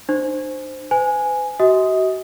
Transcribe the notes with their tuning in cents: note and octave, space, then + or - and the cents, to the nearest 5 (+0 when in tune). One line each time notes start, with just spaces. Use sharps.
D4 +40 C5 +0
B4 +45 G#5 +0
F#4 +35 D#5 +45 D#6 +5